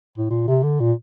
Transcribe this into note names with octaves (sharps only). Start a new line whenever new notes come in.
A2
A#2
C3
D3
A#2